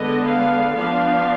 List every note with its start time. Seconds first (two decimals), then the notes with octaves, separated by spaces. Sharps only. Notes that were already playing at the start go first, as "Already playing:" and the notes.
Already playing: D3 G#3 B3 D4 D#5
0.25 F5
0.75 F3 B3 D4 F5